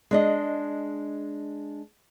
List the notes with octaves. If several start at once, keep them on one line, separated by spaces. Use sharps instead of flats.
G#3 D4 D#5